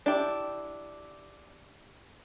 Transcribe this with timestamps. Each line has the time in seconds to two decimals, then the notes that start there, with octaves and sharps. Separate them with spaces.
0.06 D4 E4 G4